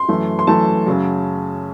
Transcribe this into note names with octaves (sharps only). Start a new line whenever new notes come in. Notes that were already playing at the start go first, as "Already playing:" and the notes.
Already playing: C6
F#2 E3 A3
C6
F#2 E3 A3 A5
F#2 C#3 F#3